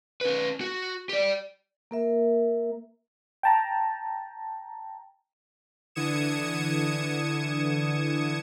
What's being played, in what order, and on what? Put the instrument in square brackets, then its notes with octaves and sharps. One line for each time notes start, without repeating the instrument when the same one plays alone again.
[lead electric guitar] C#4 B4
F#4
G4 D5
[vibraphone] A#3 A#4 E5
[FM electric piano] G5 A5 A#5
[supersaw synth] D3 E3 D#6 G#6 C#7 E7